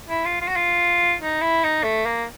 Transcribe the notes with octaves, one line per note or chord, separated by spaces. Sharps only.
E4
F4
F4
F#4
F4
D#4
E4
D#4
A3
A#3